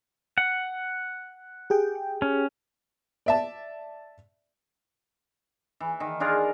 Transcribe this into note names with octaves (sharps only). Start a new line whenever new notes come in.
F#5
G4 G#4 G5
C#4
D5 E5 A5
E3
D#3
D4 F4 G#4 A#4